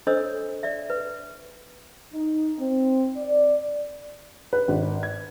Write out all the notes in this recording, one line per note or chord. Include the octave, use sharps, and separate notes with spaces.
D4 A4 C5 C#5 D#5 E6
D5 E5
B4
D#4
C4
D5
B4
G#1
G#6